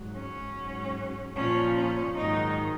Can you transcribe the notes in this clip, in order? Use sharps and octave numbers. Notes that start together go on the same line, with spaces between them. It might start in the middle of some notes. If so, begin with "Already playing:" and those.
Already playing: G#2 F#3
C#4
G#2 F#3
A#2 F3 C#4
C#4
G#2 D#3 F#3 D#4